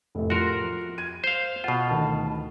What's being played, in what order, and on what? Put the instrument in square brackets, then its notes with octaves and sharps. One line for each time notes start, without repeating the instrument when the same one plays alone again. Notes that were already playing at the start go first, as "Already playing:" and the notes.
[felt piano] F1 A2
[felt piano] F3 C6 [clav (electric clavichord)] F#4 A#4
[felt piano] G#6 D#7
[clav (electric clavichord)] C5 F5
[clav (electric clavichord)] B2 F4 [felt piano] F#5
[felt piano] D2 D#3 A5